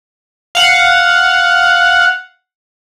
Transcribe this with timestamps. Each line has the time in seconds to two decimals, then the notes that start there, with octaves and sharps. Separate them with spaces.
0.55 F5 F#5